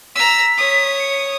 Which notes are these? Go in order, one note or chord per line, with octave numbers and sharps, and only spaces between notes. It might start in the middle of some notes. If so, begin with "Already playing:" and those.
A#5 E6 B6
C#5 D#6
C#7